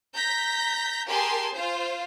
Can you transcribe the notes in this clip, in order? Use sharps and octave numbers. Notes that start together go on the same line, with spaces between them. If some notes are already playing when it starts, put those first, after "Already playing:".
A#5 G6 A#6 B6
G4 G#4 A#4 G#5 A5 C6
F4 C5